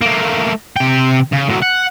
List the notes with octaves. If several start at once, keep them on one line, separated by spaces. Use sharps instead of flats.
A3 A#3
C3 G5
C#3
A2 F#3
F#5